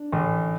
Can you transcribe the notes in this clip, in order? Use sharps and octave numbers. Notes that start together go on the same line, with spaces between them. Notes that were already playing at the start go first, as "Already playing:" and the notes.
Already playing: D4
A1